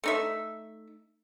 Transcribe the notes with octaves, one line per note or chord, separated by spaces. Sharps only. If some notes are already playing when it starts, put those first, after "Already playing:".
A3 D#4 E5